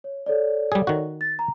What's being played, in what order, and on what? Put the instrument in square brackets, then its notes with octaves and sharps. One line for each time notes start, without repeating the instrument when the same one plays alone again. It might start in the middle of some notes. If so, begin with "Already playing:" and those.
[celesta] C#5
A4 C#5 D5
[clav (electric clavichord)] G3 G#4
D#3 F#4
[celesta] A6
A#5